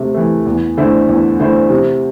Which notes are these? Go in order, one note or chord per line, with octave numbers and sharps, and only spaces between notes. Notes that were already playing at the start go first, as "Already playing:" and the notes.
Already playing: C3 A3
E3 A3
E2
D3 A3 E4 C5
E2
D3 A3 E4 C5
C3